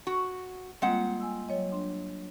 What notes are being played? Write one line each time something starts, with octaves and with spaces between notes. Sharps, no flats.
F#4
G3 G#3 A#3 C4 F4 F#5
G#5 E6
F#3 C#5 D#5
D4 C6